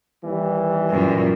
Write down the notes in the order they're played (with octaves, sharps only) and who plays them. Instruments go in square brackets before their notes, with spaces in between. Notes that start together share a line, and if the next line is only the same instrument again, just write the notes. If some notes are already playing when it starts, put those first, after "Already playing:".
[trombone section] D#2 E3 G3
[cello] F#2 A#2